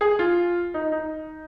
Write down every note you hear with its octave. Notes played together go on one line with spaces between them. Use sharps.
G#4
F4
D#4
D#4